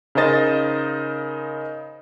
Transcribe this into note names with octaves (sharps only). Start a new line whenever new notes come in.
C#3 D#4 A#4 C5 D#5 A6